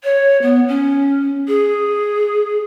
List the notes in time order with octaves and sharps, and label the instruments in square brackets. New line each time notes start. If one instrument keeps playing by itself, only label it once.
[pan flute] C#5
B3
C#4
G#4